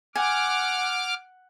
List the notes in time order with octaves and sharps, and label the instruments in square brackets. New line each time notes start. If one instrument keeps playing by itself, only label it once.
[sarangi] F#5 [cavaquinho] G#5 [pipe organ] D6 F6